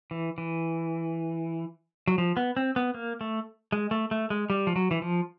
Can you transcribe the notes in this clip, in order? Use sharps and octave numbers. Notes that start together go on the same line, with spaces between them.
E3
E3
F#3
F3
B3
C4
B3
A#3
A3
G#3
A3
A3
G#3
G3
F3
F#3
E3
F3